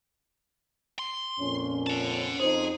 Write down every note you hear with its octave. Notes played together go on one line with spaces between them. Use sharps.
C6
F2 A#2 C#4
F#5 A5
F2 D#4 G#4 C5